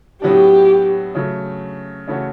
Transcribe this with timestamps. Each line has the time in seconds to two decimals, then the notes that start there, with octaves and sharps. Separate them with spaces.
0.22 A2 F#3 B3 D4 G4
1.15 C#3 F#3 A3
2.08 C#3 E3 A3 C#4 F#4